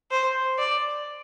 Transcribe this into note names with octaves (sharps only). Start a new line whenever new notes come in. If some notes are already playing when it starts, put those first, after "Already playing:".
C5
D5